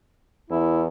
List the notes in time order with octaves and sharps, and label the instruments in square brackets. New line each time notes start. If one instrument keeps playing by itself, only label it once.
[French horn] E2 [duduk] E4